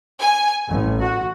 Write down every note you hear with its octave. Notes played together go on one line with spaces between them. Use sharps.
G#5
A1
F#4